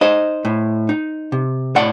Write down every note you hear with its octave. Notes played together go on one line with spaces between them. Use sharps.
D#4 C5 D#5
A2
D#4
C3
A2 D5 F#5